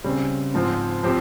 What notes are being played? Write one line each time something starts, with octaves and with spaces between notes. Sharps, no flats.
C#3 G3 C4
G#2 F3 C4
F3 C4 G4